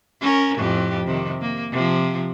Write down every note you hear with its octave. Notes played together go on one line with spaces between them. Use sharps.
C#4 A#4
F2 A2 G4
C3 D#3
A#3
C3 F3